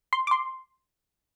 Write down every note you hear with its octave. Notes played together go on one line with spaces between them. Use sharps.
C6
D6
C6